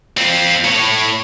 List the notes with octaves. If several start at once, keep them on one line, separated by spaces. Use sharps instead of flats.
C4 F4
A2 C#5